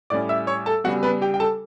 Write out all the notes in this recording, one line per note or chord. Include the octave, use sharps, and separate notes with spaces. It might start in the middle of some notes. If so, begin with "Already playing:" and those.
A2 G3 C#4 D5 D6
E5 E6
C#5 C#6
A4 A5
C#3 G3 B3 F#4 F#5
B3 B4
G4 G5
G5
A4 A5